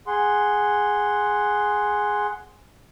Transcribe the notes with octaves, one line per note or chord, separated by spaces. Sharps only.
G#4 F#5 C6